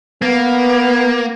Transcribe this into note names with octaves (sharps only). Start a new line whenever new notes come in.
A#3 B3